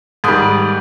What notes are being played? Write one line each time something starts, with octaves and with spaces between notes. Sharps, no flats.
G#2 D#3 G3 D#6